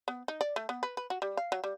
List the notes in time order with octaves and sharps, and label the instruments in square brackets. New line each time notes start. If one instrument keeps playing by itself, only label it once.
[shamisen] B3
D#4
D5
A3
B3
B4
B4
F#4
G3
F5
F#3
G3